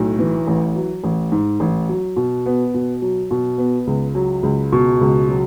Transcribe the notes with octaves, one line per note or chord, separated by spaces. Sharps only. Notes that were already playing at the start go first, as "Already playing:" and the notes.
Already playing: B1 A2
E3
A1
F#3
A1
G#2
A1
F#3
B2
B3
B2
F#3
B2
B3
C#2
F#3
C#2
B2
C#2
F#3